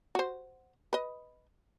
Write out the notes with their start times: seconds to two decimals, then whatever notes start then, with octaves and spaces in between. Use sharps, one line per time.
0.15 F#4 C5
0.93 B4 D#5